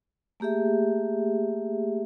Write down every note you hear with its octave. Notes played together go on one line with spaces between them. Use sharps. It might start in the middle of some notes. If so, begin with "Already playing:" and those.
A3 A#3 G4 G#4 E5